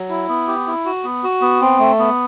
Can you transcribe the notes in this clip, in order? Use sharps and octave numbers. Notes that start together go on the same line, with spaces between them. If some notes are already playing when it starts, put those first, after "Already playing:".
Already playing: F#3
E4
B3
G4
E4
F#4
B3
F#4
B3
C4
A3
B3